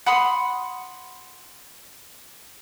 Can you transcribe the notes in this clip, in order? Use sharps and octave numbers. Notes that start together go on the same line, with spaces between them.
F#5 B5 C6 D#6